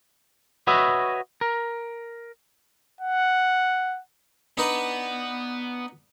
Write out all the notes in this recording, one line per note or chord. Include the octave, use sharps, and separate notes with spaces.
F#4 B4 C#5 D#5 E5
A#4
F#5
B3 D4 D#4 B4